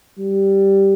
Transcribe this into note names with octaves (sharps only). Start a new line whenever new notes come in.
G3